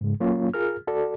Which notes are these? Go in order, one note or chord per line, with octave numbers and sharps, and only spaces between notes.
G#2 C#3 G#3
F#3 A#3 C#4 F4 C#5
F4 G#4 A#4 F6
F#4 A4 D5